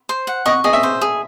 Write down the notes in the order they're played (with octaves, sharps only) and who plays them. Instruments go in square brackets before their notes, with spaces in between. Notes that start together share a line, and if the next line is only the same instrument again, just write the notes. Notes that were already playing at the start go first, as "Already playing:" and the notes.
[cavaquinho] C5
F#5
[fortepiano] D#5 [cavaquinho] C#6
[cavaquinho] G#4 [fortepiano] D#5
[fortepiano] E5
[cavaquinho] C5
G#4